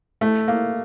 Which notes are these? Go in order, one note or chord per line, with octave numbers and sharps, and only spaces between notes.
A3
A#3